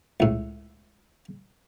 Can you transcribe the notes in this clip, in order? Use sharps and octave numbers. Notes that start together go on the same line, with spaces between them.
C#2 A2